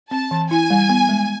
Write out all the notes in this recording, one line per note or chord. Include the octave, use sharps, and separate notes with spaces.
C4 A5
E3
E4 G#5
G3
B3
G#3